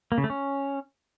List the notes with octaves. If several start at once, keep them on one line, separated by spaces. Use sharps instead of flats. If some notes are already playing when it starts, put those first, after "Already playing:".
A#3
C#3
A3
C#4